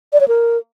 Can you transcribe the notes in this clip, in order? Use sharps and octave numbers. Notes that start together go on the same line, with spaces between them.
D5
C#5
A#4